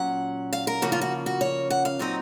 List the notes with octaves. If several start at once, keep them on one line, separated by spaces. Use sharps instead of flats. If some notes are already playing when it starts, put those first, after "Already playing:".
Already playing: A#2 F#3 C#4 F#5
F5
A#4
C#3 F3 A#3 C#4 F#4
F4
F#4
F#4
C#5
F#5
F5
A#2 F#3 C4 D#4 D#5